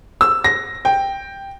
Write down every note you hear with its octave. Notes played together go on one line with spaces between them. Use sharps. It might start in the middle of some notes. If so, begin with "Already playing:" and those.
E6
A#6
G5